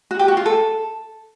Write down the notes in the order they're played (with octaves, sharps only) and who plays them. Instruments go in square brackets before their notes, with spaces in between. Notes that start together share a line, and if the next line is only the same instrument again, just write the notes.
[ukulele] F#4
G4
F#4
F4
A4